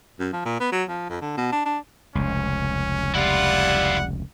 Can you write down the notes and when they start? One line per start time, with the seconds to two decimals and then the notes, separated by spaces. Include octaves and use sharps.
0.19 F#2
0.33 F3
0.45 A#2
0.60 B3
0.72 F#3
0.89 F3
1.10 F2
1.22 D3
1.37 B2
1.52 D4
1.66 D4
2.15 F1 C#2 C#4
3.15 G3 E4 F4 F#5